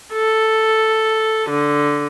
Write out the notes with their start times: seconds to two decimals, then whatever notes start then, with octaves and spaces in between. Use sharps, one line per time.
0.13 A4
1.50 D3